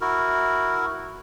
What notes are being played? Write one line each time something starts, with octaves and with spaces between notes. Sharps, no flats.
E4 F#4 A#4